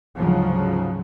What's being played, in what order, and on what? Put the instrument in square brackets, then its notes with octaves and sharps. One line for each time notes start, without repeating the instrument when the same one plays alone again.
[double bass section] D2 G#2 C#3 F3 F#3